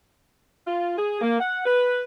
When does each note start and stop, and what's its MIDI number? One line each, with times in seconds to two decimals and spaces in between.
0.66 0.95 65
0.98 1.20 68
1.21 1.39 58
1.40 1.61 78
1.66 2.03 71